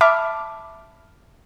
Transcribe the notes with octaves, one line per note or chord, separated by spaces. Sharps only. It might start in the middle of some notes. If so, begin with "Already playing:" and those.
E5 A5 B5 D6 F6